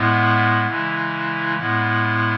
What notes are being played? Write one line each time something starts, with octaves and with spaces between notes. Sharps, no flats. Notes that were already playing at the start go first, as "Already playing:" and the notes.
Already playing: A2 G#3 B3 E4
C#3 E3 G#3
A2 G#3 B3 E4